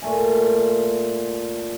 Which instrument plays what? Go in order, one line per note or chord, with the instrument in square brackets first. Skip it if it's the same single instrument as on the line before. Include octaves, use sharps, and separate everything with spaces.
[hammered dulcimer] A#2 A3 G#5